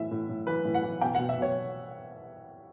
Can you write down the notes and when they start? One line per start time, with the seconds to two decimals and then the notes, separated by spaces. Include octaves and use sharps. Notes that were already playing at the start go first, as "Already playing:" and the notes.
Already playing: A2 E3 E5
0.11 A2
0.29 A2
0.47 E3 B4
0.65 A2
0.74 F#5
0.83 E3
1.01 B2 G5
1.15 F#5
1.19 B2
1.29 E5
1.38 B2 C#5